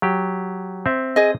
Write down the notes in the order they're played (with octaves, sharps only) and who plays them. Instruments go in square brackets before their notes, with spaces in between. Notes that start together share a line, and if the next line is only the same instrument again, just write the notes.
[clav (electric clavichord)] F#3 G4
C4 E5
[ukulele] G#4 D#5